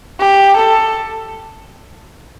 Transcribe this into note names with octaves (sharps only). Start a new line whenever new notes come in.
G4
A4